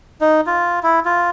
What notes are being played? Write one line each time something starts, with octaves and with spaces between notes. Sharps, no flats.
D#4
F4
E4
F4